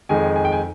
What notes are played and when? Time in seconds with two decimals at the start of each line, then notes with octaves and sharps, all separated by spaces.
0.09 F2 D#3 G#3 G#5
0.36 G#5
0.45 G5
0.52 G#5